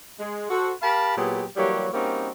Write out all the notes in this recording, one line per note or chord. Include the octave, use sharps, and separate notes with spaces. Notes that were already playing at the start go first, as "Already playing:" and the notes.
G#3
F#4 A4 C5
G4 A#4 F5 A5 B5
A#2 F#3 B3 G4 G#4
E3 F#3 G3 A#3 G4 C#5
G3 A#3 C4 C#4 D#4 F#4